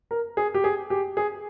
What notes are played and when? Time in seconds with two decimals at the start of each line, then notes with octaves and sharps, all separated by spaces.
0.11 A#4
0.37 G#4
0.54 G4
0.64 G#4
0.90 G4
1.17 G#4